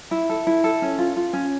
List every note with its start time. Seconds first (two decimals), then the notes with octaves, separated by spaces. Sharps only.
0.11 E4 E5
0.29 A4
0.47 E4
0.64 A4
0.82 C#4
0.99 F4
1.16 F4
1.33 C#4